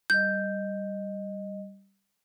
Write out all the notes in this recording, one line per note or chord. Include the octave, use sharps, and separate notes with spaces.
G3 D#5 G6